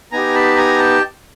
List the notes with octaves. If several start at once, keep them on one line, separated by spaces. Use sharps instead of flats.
B3 D#4 G4 G#5 A#5
A5 B5
G#5 A#5
G5 A5